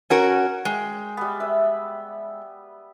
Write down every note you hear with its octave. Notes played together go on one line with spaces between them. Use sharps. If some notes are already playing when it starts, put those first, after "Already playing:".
C#4 F#4 A#4
G#3 G5
G3 B3
B4 E5